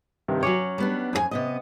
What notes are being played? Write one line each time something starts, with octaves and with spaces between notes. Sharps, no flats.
G2 C3 D#3
F#3 C#4 C#5 D6
G3 B3 D4
F2 G#4 G#5
C3 B3 D#5